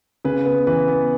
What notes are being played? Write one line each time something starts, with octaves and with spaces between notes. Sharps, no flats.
C#3 B4
B3
E3 B4
B3